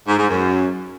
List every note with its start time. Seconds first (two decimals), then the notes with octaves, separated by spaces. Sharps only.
0.08 G#2
0.19 G#2
0.30 F#2